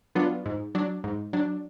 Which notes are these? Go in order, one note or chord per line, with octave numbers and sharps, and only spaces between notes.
F#3 B3 D4 F4
G#2
F#3 D4
G#2
F#3 D4